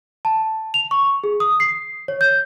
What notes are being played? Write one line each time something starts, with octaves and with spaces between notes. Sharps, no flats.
A5
F7
C#6
G#4
D#6
C7
C#5
G6